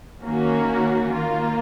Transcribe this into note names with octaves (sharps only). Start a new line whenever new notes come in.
D#3 A#3 C#4 F#4
D#3 A#3 F4